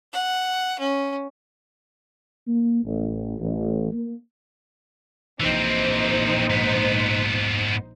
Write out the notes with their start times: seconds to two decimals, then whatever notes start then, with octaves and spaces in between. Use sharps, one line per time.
0.13 F#5
0.79 C#4
2.47 A#3
2.84 A1
3.39 A1
3.92 A#3
5.40 A#1 E3 C4 D#4 C5
6.50 G#2 B3